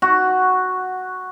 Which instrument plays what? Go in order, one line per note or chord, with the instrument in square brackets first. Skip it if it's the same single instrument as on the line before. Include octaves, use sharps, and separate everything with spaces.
[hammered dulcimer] F#4